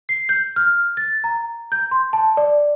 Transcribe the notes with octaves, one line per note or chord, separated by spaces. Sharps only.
C7
G6
F6
A6
A#5
G6
C6
A5
D5